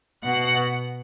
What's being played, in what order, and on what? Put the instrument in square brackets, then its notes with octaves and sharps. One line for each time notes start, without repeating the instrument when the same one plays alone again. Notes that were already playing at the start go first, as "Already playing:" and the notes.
[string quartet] B2 F#5